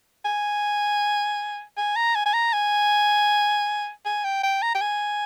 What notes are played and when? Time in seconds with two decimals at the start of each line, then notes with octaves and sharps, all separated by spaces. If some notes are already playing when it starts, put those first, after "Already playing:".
0.25 G#5
1.77 G#5
1.96 A#5
2.15 G#5
2.26 G#5
2.34 A#5
2.53 G#5
4.06 G#5
4.24 G5
4.43 G5
4.62 A#5
4.75 G5
4.81 G#5